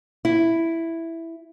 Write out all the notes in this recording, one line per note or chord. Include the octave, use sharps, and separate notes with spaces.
E4